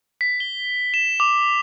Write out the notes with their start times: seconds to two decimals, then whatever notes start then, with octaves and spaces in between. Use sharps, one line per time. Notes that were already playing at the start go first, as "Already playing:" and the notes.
0.21 B6
0.40 G7
0.94 E7
1.20 D6